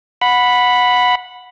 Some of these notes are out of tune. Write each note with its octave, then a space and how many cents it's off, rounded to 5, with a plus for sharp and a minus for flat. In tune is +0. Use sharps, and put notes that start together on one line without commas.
F#5 -20 B5 +0